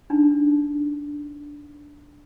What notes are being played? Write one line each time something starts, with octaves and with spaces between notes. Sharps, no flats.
D4 D#4